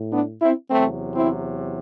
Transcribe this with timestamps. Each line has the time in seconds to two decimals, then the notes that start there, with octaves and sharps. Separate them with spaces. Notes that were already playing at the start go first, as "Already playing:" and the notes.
Already playing: A2
0.12 B3 D4
0.41 C4 E4
0.71 E2 C3 F#3 A3 C4
1.15 C4 E4